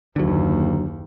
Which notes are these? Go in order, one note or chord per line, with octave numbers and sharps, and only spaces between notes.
F#1 D#2 D3 F#3